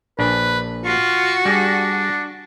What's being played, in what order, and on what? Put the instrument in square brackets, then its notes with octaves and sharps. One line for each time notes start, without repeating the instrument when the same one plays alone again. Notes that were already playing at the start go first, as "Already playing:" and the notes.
[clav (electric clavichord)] A#1 D4 [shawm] B4
[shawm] F4 [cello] F#4
[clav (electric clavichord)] G3 G#4 [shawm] D4